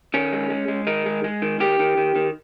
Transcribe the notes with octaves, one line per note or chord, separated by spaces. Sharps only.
D#3 C#4
G#3
G#3
G#3
D#3 D#4
G#3
G#3
D#3
D#3 G4
D#3
D#3
D#3